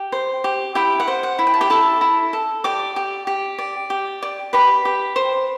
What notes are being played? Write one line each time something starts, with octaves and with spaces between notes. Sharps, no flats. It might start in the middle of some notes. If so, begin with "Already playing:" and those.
Already playing: G4
C5
G4
E4 G4 G5
F#5
C5
F#5
E4
G5
A5
G4 G5
E4 A4 A5
E4
A4
G4 D5 D6
G4
G4
D5
G4
D5
G4 B4 B5
G4
C5